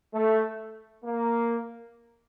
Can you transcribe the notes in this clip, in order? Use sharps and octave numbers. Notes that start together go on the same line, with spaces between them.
A3
A#3